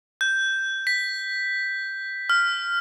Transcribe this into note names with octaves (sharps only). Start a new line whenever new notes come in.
G6
B6
F6